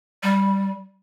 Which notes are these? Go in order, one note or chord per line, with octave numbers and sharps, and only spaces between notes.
G3